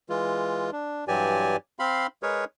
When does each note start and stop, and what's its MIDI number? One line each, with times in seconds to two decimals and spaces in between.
0.09 0.71 52
0.09 0.71 56
0.09 0.71 65
0.72 1.05 62
1.08 1.57 43
1.08 1.57 52
1.08 1.57 54
1.08 1.57 67
1.08 1.57 74
1.08 1.57 80
1.79 2.07 60
1.79 2.07 77
1.79 2.07 83
1.79 2.07 84
2.23 2.45 56
2.23 2.45 68
2.23 2.45 70
2.23 2.45 71
2.23 2.45 73